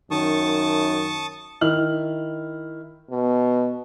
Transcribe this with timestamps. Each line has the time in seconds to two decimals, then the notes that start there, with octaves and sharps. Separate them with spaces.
0.11 F#2 D#3 A5 C#6 D#6
1.61 D#3 E4 F6 F#7
3.11 B2